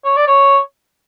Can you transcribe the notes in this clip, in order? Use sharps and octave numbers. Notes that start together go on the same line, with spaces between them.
C#5
D5
C#5